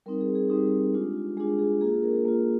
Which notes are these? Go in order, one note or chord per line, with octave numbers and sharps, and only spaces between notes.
G3 C4 D#4 A#4
G#4
G#4
G3 C4 D#4 G4
G#3 D4 F4
G#3 D4 F4 G#4
G#4
A#3 F4 G#4
A#4
A#3 F4